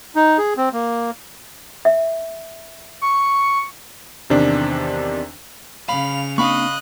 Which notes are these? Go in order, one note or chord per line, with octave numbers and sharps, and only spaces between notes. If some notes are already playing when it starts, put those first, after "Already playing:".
D#4
G#4
C4
A#3
E5
C#6
E2 C3 D#3 D4
C#3 F5 B5 F7
A#3 C4 D4 D#5 F5 B5 C#6 F#6